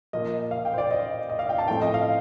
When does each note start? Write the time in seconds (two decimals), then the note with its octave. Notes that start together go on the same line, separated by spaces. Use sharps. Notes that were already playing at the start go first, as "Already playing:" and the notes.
0.13 A#2 F3 A#3 D#5
0.51 F5
0.65 G5
0.74 C5
0.78 D5
0.91 D#5
1.29 D#5
1.39 F5
1.49 G5
1.58 A5
1.68 A2 F3 A3 C4 G5
1.82 D#5
1.94 F5